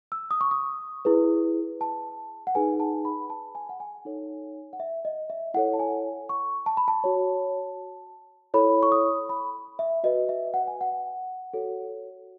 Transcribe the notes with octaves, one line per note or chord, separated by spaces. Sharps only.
E6
D#6
C#6
D#6
E4 G#4 B4
A5
F#5
D#4 G#4 B4 G#5
A5
B5
A5
G#5
F#5
G#5
D#4 A4 C#5
F#5
E5
D#5
E5
E4 A4 C#5 F#5
A5
G#5
C#6
A5
B5
A5
F#4 C#5
E4 A4 C#5 B5
C#6
D#6
B5
E5
F#4 B4 D#5
E5
F#5
G#5
F#5
F#4 A4 C#5